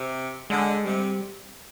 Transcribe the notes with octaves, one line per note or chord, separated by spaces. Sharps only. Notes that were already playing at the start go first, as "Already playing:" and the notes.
Already playing: C3
D3 G#3
C3 G3